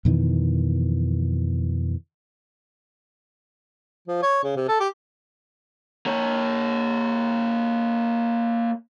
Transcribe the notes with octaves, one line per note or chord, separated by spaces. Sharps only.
F2 B2 D#3 E3
F3
C#5
C#3
C3
A4
G4
A#3 C#5